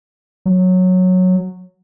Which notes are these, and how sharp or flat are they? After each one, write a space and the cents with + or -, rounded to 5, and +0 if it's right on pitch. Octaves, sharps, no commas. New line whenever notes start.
F#3 -10